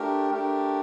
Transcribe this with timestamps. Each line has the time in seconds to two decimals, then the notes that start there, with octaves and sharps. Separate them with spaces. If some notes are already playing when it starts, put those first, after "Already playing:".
Already playing: A3 D4 G4 A#4
0.31 A3 D4 G4 A#4